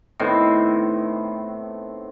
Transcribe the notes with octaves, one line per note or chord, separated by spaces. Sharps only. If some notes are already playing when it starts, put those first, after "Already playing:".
A2 D#3 B3 C4